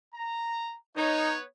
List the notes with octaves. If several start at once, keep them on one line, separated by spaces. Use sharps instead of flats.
A#5
B3 D#4 B4 C#5